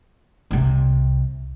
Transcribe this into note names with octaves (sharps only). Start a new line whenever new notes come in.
C2 C3